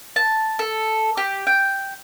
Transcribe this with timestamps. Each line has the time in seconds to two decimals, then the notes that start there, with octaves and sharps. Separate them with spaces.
0.16 A5
0.59 A4
1.17 G4
1.47 G5